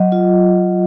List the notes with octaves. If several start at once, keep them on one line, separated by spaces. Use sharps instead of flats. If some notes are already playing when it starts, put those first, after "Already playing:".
Already playing: F#3 D#5
F4